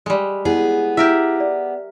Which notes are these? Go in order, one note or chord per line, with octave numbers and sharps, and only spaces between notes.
G3 G#3
B3 E4 G#4
E4 G4 A#4 E5
D5